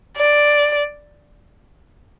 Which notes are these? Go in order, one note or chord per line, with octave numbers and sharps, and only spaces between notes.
D5